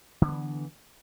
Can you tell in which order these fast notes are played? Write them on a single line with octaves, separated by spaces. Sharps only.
D3 B3 F#3 E3